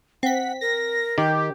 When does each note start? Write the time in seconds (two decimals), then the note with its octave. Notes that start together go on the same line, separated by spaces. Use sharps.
0.23 C4 F#5 B6
0.61 A#4 A#6
1.18 D#3 G4